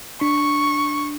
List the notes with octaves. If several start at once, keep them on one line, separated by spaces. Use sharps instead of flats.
D4 C#6